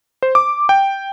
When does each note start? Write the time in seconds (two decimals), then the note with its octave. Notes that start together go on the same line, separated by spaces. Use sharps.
0.23 C5
0.35 D6
0.69 G5